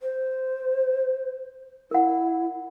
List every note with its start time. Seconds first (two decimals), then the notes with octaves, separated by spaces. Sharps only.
0.01 C5
1.91 E4 A#4 F#5